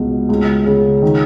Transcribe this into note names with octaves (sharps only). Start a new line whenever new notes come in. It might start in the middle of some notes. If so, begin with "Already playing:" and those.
Already playing: C#2 B2
C#2
C#3
D#3